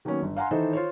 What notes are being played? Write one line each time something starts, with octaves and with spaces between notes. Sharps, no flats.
D#3 F#3 A#3 B3 C#4
G1
F5 F#5 G#5 A#5 C6
D#3 E3 D#4 A4 C5 D#5
F4 C5 C#5